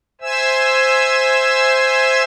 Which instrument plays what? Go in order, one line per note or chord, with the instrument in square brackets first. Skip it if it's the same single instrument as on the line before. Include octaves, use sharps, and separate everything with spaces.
[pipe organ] C5 E5 G#5 E6